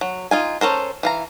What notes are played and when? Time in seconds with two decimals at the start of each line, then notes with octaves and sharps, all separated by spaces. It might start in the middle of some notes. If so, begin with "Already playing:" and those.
0.01 F#3
0.31 D#4 F4 G#5
0.61 C#4 A4 A#4 C5
1.03 E3 F5 A#5